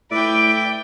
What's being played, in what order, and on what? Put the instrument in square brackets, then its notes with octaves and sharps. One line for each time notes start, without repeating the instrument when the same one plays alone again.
[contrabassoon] A2 [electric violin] B4 G5 [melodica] D5 E5 [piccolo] D7